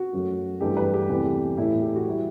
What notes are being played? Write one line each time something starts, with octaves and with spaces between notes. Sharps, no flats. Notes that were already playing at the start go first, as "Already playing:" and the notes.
Already playing: F#4
F#2 F#3 A3
G2 E3 A3 G4
B4
G4
E2 C3 E3 A3
A2 E3 A3 E4
G4
F#4
E3 G3 E4